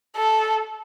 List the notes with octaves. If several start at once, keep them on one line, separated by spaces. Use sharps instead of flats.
A4